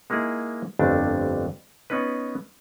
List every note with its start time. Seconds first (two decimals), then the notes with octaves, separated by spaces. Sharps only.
0.10 G#3 A#3 D#4 E4 G#4
0.79 G1 F2 D3 A3 D4
1.90 B3 C#4 D#4 B4